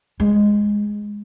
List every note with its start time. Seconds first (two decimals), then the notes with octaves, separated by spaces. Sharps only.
0.20 G#3